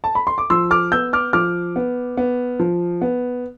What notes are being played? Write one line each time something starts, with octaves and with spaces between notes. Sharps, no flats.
A5
B5
C6
D6
F3 C6 E6
D6 F6
B3 E6 G6
D6 F6
F3 D6 F6
B3
B3
F3
B3